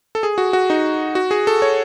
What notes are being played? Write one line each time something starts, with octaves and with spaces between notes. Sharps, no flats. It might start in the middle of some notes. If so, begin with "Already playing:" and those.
A4
G#4
F#4
F#4
D#4
F#4
G#4
A4
C#5